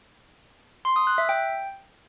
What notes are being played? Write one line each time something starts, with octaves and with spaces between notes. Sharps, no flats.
C6
D#6
F#6
E5
G5